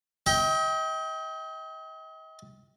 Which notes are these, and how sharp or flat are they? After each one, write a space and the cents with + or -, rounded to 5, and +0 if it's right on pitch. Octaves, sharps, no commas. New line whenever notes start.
D#5 +40 G5 +0